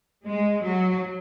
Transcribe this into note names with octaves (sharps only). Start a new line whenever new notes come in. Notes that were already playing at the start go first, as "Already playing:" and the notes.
G#3
F#3